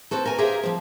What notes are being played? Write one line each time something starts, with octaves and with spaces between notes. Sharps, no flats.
C4 E4 F#4 A4
A#4 G#5
G4 G#4 A#4 C5 E5 F5
F3 C4